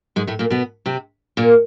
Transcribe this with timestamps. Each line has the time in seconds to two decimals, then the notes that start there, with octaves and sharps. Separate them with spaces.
0.16 G#2 G#3
0.27 A2 A3
0.39 A#2 A#3
0.50 B2 B3
0.86 C3 C4
1.37 A#2 A#3